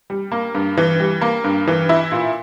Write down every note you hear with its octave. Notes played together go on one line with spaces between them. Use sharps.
G3
A#3
G2
E3
G3
A#3
G2
E3
E4
A#2